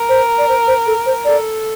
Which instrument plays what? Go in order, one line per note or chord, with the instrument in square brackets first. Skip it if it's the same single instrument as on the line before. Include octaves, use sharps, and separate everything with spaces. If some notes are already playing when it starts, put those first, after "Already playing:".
Already playing: [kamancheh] A#4
[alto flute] C5
D5
C5
C5
A4
C5
[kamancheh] A4 [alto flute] D5